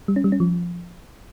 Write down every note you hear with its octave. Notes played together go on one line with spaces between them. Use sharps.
G3
C#4
G3
C#4
F3